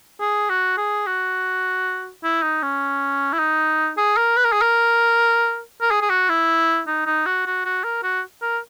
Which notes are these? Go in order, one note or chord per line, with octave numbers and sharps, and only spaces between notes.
G#4
F#4
G#4
F#4
E4
D#4
C#4
E4
D#4
G#4
A#4
B4
A#4
G#4
A#4
A#4
G#4
G#4
F#4
E4
D#4
D#4
F#4
F#4
F#4
A#4
F#4
A#4